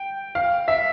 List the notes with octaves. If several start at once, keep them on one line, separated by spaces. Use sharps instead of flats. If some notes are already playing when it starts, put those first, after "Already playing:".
Already playing: G5
F5
E5